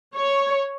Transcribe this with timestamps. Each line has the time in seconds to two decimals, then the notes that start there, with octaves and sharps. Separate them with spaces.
0.15 C#5